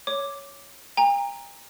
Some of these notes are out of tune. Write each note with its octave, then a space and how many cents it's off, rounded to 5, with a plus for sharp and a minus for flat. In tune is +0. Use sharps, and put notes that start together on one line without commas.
C#5 +5 D6 +0
G5 +45 A#5 +0